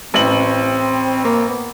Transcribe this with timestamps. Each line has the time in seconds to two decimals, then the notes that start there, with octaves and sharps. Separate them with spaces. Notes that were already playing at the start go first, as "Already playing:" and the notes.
0.14 A1 C4 F#7
1.24 A#3
1.49 B3